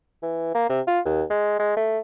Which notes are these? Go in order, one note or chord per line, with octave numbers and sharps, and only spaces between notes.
E3
A#3
C3
F4
D#2
G#3
G#3
A3